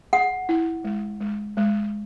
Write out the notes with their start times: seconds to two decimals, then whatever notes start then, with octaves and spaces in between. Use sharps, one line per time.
0.13 G#4 F#5
0.49 E4
0.84 G#3
1.20 G#3
1.57 G#3